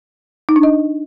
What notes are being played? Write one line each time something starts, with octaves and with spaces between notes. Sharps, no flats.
D#4
D4
D#5